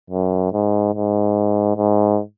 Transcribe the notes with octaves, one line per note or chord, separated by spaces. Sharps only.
F#2
G#2
G#2
G#2